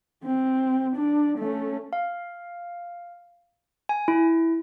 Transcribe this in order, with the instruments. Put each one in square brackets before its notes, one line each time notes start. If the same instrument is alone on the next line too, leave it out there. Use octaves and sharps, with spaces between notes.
[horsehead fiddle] C4
D4
A3 C#4
[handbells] F5
G#5
E4